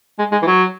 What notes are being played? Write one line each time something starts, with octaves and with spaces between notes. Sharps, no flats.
G#3
G#3
E3
F#3